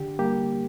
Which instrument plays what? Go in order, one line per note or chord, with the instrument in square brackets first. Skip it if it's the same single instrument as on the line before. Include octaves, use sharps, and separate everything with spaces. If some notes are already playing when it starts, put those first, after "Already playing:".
Already playing: [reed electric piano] D3 G4
G3 A#3 G4